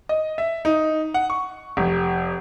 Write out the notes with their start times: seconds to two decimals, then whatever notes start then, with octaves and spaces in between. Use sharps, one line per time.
0.09 D#5
0.38 E5
0.65 D#4
1.14 F#5
1.30 C#6
1.77 F1